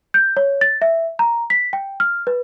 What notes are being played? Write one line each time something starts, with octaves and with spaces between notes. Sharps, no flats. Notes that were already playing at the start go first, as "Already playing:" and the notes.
G6
C#5
A6
E5
A#5
B6
G5
F6
B4